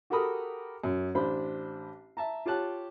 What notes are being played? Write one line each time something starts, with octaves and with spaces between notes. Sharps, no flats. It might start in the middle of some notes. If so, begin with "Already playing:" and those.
F#4 G4 A4 A#4 B5 D#6
F#2
A1 D4 C5 B5
E5 A5 A#5
F4 G4 C#5 A5 F#6